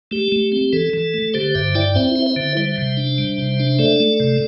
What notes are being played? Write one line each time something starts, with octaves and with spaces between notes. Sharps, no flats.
A3 G4
A3
C4
E3 A4
E3
A3
D3 G4 C5
G2 C5 E5
E4 D5 G5
C4 C5 E5
E4
C5 E5
D3
G3 C5 E5
C3
D4
G3
C3
D4
A3 A4 D5
A3
C3